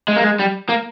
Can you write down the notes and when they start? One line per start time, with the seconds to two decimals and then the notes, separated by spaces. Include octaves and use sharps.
0.08 G#3
0.16 A#3
0.24 G#3
0.39 G3
0.69 A#3